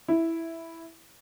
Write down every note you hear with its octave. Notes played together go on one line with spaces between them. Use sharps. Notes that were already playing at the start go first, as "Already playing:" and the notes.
E4